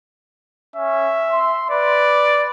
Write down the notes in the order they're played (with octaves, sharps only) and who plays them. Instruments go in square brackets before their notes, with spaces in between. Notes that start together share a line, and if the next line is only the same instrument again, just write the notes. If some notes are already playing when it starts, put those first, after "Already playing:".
[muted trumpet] C#4 [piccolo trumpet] E5
[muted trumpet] C6
[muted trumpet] B4 [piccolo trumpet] D5